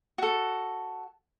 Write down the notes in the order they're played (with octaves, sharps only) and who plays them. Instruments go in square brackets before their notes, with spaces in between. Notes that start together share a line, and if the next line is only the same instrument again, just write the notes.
[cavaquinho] F#4 A4